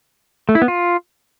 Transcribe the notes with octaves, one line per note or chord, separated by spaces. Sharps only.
A3
E4
B3
F4